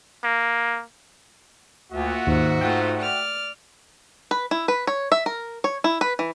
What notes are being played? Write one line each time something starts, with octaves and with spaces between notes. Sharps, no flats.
A#3
D2 A#3 F4 F#4 E5 F#5
D#2 G#2
A3 F4 C5 G5
D5 F6
B4
E4
B4
C#5
E5
A#4
C#5
E4
B4
E3